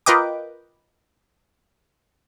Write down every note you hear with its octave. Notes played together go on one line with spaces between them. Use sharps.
F4 A#4 B4 D#5 G5 D6